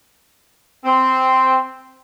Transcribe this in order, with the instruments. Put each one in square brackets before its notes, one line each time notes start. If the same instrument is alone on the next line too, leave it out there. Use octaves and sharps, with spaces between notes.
[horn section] C4